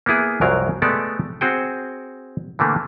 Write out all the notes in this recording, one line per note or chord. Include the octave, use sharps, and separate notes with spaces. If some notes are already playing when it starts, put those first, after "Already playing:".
A#3 B3 E4 G#4
C2 F#2 F3 F#3 A#4 F5
G#3 A3 B3 G4 A4 D5
C4 F#4 G#4 G5
D3 E3 A3 A#3